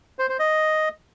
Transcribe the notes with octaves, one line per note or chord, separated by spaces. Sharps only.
C5
C5
D#5